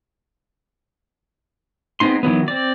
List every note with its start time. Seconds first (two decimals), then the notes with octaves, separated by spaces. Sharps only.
2.00 G#3 B3 C4 D#4 C6
2.23 D#3 E3 F#3 B3
2.48 C4 D5